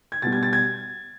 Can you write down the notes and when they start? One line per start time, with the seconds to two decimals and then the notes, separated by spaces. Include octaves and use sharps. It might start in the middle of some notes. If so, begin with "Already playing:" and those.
0.12 G#6
0.22 B2 G3 A6
0.32 G#6
0.43 A6
0.53 G#6